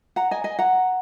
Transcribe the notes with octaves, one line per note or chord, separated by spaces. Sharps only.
F#5 A#5
D#5 G#5
D#5 G#5
F#5 A#5